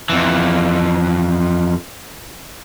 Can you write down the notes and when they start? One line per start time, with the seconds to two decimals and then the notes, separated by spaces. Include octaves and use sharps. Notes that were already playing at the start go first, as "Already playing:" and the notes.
0.09 F2 E3